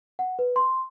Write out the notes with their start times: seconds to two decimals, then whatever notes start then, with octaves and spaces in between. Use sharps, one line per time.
0.19 F#5
0.39 B4
0.56 C6